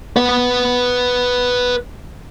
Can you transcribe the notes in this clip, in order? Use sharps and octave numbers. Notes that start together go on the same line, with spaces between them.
B4 F#5